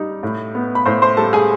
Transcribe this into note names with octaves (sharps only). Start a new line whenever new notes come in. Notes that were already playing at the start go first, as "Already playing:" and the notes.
Already playing: G3 D#4
A2
B3
B5
A2 C5 C6
C5 C6
G3 A4 A5
G#4 G#5